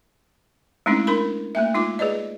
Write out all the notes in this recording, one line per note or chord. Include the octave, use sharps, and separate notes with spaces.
G#3 A3 C4 C#4 D#4 E4
D4 A#4 B5
A3 A#3 E5
G#3 D#4 F4 D6
G#4 B4 D5 D#5